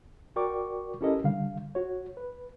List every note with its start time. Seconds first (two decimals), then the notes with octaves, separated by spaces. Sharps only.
0.36 F#4 A#4 D5 G5 C#6 D6
1.01 C#4 E4 G4 A4 A#4 D#5
1.24 D3 G3 F5
1.75 F#4 C#5
2.17 B4